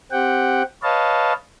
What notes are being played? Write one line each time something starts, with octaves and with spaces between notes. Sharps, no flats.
C4 G4 F#5 G5
B4 C#5 D#5 F5 A5